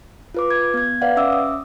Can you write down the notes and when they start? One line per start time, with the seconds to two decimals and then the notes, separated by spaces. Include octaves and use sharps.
0.34 F4 B4 D6
0.50 G#6
0.74 B3 G#6
1.02 B4 D5 F5 F#5
1.17 C#4 E5 D6 E6
1.32 D#6